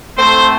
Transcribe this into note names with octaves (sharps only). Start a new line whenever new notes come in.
A2 A3 C4 C5